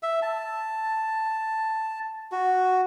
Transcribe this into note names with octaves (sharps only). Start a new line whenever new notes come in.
E5
A5
F#4